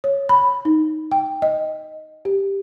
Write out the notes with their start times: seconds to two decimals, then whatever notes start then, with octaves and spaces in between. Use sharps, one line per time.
0.04 C#5
0.29 B5
0.65 D#4
1.12 G5
1.42 D#5
2.25 G4